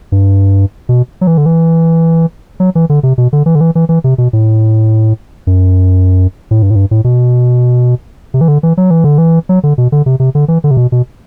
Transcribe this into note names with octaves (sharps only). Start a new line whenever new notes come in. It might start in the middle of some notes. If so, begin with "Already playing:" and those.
G2
B2
F#3
E3
D3
E3
F#3
E3
D3
C3
B2
D3
E3
D3
E3
E3
E3
C3
B2
A2
F#2
A2
G2
A2
G2
A2
B2
C3
E3
D3
E3
F#3
E3
D3
E3
F#3
D3
B2
D3
C3
C3
D3
E3
D3
C3
B2
B2